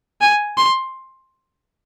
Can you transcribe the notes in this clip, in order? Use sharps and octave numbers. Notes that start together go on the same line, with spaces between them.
G#5
C6